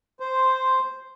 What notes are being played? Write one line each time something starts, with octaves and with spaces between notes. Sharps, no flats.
C5